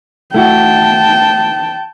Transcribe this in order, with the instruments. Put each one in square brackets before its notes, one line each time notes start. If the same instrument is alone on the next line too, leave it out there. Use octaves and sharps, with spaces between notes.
[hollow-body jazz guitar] A3 E4 F#4 [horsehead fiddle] G5 A5